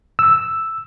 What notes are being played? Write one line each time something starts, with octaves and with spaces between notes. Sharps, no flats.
E6